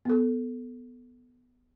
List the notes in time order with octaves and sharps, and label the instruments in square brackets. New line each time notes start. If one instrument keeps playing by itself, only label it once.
[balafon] B3 A4